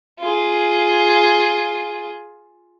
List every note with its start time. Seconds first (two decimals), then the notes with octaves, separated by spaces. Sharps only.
0.20 F4 G#4